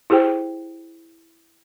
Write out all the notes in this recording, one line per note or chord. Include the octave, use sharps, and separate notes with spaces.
E4 G4 G#4 C5 G5